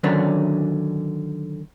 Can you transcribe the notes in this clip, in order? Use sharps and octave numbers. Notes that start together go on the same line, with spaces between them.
D3 D#3 F#3 C#4 D4 B4